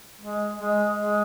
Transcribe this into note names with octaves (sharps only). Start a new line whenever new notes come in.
G#3
G#3
G#3